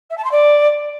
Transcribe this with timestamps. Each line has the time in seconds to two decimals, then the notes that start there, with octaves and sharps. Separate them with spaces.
0.10 E5
0.17 A5
0.24 C6
0.31 D5